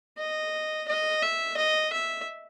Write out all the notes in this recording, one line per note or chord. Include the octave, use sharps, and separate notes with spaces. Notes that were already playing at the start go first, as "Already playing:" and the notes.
D#5
D#5
E5
D#5
E5